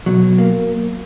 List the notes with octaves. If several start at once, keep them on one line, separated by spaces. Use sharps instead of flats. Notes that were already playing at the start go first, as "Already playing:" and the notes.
B2 F#3
A#3